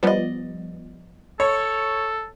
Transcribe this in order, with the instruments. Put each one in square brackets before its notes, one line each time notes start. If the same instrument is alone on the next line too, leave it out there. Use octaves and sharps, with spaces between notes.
[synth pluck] F3 G3 B3 [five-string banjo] D5 D#5
[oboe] A4 [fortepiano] C#5